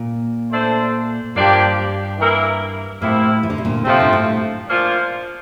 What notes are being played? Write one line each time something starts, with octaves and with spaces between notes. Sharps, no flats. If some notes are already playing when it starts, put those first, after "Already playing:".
Already playing: A#2
A3 D4 A4 C5
G2 F3 A#3 D4 G4
E3 A#3 E4 A#4
A2 C3 F3 A#3 E4
E3
D3
C3
A#2 D3
C3 F3 A3 C4
G2
A2
A#2 F3 A#3 F4 C5